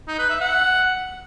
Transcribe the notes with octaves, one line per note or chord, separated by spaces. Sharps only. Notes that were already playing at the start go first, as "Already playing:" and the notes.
D#4
B4
E5
F#5